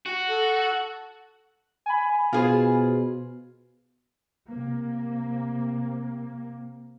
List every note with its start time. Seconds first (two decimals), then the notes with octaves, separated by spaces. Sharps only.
0.06 F#4
0.28 A4
1.86 G#5 B5
2.33 B2 F4 G#4 C5
4.49 C3 A#3